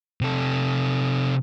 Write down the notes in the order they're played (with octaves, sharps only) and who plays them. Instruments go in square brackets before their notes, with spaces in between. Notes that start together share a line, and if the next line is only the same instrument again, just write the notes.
[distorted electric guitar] C3 A4